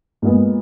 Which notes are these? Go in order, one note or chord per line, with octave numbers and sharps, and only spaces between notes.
A#2 G#3 B3